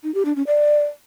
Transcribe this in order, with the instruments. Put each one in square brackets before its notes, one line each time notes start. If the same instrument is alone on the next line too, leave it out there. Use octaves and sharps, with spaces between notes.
[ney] D#4
G4
D4
C#4
D5